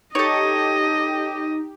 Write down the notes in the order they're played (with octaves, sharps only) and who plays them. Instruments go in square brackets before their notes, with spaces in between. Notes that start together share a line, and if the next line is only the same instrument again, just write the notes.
[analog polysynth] D#4 [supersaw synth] G4 [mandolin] A4 C#5 [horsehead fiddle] D#5